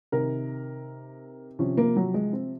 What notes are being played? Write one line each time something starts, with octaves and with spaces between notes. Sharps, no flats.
C3 D#3 A#4
C3 F3 C#4
A#3
F#3
G#3
C4